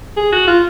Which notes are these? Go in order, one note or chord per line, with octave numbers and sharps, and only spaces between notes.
G#4
F#4
F4